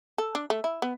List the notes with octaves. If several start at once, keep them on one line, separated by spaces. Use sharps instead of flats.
A4
D4
A3
E4
B3